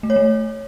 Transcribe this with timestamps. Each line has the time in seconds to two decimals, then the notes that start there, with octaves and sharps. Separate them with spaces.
0.03 A3
0.10 C#5
0.16 A3